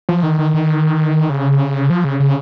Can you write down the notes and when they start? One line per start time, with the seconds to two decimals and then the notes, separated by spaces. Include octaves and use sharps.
0.09 F3
0.23 D#3
0.38 D#3
0.54 D#3
1.30 C#3
1.90 F3
2.04 C#3
2.20 C#3